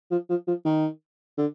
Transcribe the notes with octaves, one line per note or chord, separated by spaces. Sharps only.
F3
F3
F3
D#3
D3